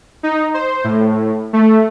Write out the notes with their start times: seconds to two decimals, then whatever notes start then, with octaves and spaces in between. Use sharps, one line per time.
0.23 D#4
0.54 C5
0.84 A2
1.53 A3